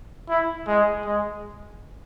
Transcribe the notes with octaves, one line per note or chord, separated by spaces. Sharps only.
E4
G#3
G#3